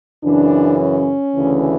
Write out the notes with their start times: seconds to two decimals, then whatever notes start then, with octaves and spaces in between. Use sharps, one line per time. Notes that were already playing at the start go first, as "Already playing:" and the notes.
0.23 F#2 C#3 E3 D4
0.79 C#4
1.35 D2 C#3 E3